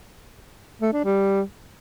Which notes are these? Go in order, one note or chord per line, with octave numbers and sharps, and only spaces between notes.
A3
D4
G3